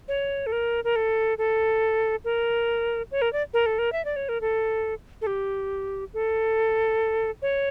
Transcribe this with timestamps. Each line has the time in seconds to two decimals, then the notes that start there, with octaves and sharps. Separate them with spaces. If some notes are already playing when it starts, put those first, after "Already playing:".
0.08 C#5
0.46 A4
0.52 A#4
0.84 A#4
0.96 A4
1.38 A4
2.24 A#4
3.11 C#5
3.22 A#4
3.33 D5
3.54 A#4
3.66 A4
3.78 A#4
3.92 E5
4.05 D5
4.16 C#5
4.29 A#4
4.41 A4
5.21 A4
5.27 G4
6.14 A4
7.42 C#5